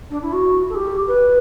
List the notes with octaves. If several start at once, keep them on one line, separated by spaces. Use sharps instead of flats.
D4
E4
F#4
A4
G4
B4